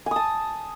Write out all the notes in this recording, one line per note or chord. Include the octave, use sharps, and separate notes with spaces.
G#5 A5 D#6